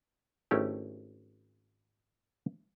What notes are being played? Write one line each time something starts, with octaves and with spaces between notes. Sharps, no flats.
G#1 A3 C#4 E4 G4